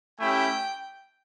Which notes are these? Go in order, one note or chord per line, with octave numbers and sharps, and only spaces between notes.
A3 C#4 E4 G4 G5